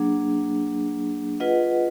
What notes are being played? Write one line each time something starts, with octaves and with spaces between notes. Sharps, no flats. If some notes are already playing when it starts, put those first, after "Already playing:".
Already playing: F#3 A#3 D4 G#4
F4 G#4 B4 D#5 F#5